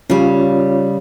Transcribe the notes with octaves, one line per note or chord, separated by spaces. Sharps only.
C#3 G3 C#4 F4 C#5